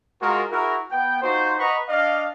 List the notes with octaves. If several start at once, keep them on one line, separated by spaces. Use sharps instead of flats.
G#3 F4 F#4 A#4
E4 F#4 G#4 A#4
B3 G5
D#4 F4 F#4 C5
B4 D#5 F#5 A#5 B5 C#6
D4 D5 D#5 F5